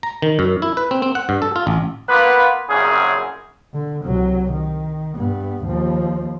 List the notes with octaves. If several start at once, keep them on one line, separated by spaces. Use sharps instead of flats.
A#5
D#3
F#2
E4
B4
C4
C4
F#5
G2
A4
F4
A1
A#3 B3 F4 B4
C2 F#2 A#2 C#3 G#4
D3
C2 F#3
D#3
G2 B3
D#2 F3